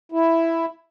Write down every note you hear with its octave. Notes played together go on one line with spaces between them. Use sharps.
E4